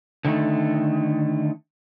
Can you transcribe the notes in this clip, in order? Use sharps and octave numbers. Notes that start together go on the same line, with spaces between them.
D3 D#3 A3